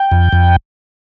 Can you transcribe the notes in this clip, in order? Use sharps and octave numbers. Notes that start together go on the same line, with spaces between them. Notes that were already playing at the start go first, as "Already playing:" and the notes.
Already playing: G5
F2
F2